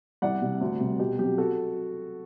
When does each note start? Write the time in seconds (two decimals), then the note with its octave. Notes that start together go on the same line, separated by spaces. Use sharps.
0.22 C2 D5 F#5
0.41 C3 G3
0.61 D2
0.80 C3 G3
0.99 B2 G4
1.19 F#3 C4 G4
1.38 F#4 A4